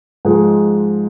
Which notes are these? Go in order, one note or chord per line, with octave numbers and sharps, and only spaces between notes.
G#2 F3 G#3